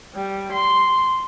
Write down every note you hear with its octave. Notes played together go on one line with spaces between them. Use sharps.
G3
C6